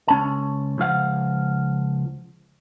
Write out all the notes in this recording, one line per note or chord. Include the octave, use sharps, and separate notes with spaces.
C#2 C#4 A5
C#2 F3 F5 F#5